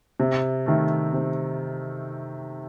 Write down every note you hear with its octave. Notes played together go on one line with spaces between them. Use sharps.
C3
D#3 A3
C3